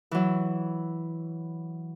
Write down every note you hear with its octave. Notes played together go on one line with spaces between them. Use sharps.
E3 F#3